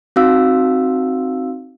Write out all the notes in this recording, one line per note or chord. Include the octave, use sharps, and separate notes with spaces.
C4 D#4 F#4 F5 E6